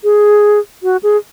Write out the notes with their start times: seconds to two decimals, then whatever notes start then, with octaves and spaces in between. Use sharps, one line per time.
0.04 G#4
0.83 F#4
1.03 G#4